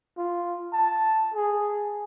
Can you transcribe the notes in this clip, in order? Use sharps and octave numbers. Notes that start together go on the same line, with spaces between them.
F4
A5
G#4